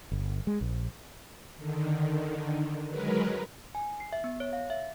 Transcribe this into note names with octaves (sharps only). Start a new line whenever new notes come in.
G1
G#3
A#1
D3 D#3
F#3 G#3 A#4 B4
G#5
C7
E5
B3
C#5
F5
E5